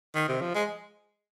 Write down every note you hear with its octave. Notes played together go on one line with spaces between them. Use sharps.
D#3
C3
F3
G#3